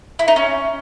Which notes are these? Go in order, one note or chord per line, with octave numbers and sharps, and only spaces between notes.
E4
D#4
C#4